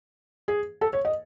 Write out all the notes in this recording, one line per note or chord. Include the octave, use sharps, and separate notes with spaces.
G#4
A4
C#5
D#5